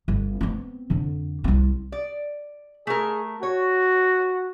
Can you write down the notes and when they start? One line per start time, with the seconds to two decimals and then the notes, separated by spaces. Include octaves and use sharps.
0.08 G1
0.41 B3 C4
0.90 F2 D3
1.44 C2 C4
1.92 D5
2.87 A3 G#4 A#4
3.43 F#4 C#5